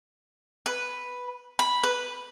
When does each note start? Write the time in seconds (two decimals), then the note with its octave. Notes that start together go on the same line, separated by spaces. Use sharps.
0.66 B4
1.59 B5
1.83 B4